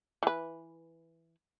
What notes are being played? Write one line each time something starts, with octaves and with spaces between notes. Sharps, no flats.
E3 B4